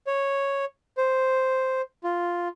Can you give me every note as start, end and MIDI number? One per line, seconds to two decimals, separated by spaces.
0.07 0.65 73
0.97 1.81 72
2.04 2.48 65